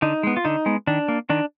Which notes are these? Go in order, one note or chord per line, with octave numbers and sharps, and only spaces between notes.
D3 D#4
G#3 B3
F4
D3 D#4
G#3 B3
D#3 D4
A#3
D#3 D4